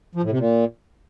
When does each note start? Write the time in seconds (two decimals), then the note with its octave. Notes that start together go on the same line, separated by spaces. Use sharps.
0.15 F3
0.23 A2
0.31 C3
0.38 A#2